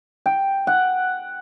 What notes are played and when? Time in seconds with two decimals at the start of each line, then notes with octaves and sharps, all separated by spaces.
0.26 G5
0.67 F#5